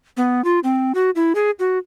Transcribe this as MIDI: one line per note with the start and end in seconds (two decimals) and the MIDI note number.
0.17 0.44 59
0.44 0.60 65
0.64 0.92 60
0.95 1.10 66
1.16 1.33 64
1.35 1.51 68
1.59 1.78 66